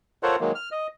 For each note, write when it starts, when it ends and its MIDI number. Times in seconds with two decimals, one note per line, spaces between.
0.23 0.36 65
0.23 0.36 69
0.23 0.36 70
0.23 0.36 72
0.23 0.36 73
0.23 0.36 78
0.40 0.52 51
0.40 0.52 54
0.40 0.52 56
0.40 0.52 58
0.55 0.69 89
0.72 0.87 75